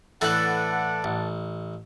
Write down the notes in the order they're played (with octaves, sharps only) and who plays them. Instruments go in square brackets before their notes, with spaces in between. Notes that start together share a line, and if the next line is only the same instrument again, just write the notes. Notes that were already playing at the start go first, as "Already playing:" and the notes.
[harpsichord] A2 E3 D4 [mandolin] A4 B4 F#6 [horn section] D5 F#5
[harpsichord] A1